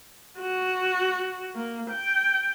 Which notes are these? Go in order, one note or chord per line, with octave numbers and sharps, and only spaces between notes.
F#4
A#3
G5